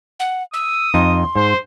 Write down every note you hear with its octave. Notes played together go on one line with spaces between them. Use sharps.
F#5
D#6 E6
F2 D#4 C6
G#2 C5